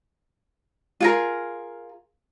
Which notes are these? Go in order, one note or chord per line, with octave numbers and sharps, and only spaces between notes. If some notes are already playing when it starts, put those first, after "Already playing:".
F4 G#4 A#4